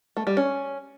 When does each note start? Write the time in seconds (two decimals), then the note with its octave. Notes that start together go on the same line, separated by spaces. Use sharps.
0.17 A3
0.27 G3
0.37 C#4